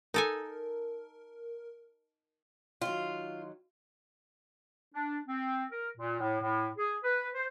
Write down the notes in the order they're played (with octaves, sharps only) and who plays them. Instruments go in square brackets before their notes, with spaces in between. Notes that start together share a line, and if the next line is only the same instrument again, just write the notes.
[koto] D#4 A4 G#5 [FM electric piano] A#4
[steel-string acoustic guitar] D#3 F#3 [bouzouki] F4
[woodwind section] D4
C4
A#4
A#2
A2
A2
G#4
B4
C5